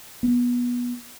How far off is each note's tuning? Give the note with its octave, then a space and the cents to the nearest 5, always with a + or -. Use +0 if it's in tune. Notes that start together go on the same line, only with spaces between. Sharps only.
B3 -20